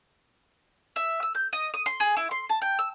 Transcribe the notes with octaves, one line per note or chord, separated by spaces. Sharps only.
E5
E6
G6
D#5
D#6
C6
G#4
E4
C6
A5
G5
E6